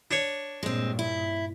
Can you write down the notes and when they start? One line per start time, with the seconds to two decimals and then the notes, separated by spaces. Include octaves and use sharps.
0.11 D4 C#5
0.63 G2 A#2 G#3 C4
0.99 E4